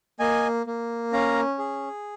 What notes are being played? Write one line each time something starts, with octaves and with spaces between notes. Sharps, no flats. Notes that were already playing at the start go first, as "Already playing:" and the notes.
A#3 D#5 G#5
A#3
C#4 F5 A#5
G#4